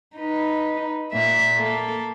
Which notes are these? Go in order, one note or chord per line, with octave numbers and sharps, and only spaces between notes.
D#4 B4
A#2 E5
A#3 A4